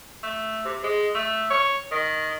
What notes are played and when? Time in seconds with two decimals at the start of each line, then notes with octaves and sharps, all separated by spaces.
0.23 A3
0.65 C3
0.84 G#3
1.15 A3
1.50 C#5
1.91 D#3